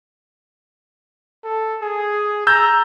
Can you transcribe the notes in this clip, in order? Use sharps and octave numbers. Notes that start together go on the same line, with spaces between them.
A4
G#4
A#5 E6 G6 A6